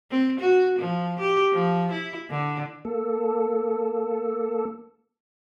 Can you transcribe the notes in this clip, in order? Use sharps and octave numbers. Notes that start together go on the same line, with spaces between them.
C4
F#4
F3
G4
F3
E4
D3
A#3 A4